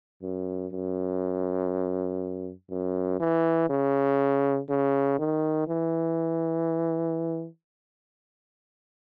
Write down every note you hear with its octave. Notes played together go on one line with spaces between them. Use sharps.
F#2
F#2
F#2
E3
C#3
C#3
D#3
E3